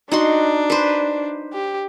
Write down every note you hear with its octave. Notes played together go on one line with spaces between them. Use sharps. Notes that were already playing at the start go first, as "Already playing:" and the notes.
D4 D#4 F#4 C6
B4 C5
G4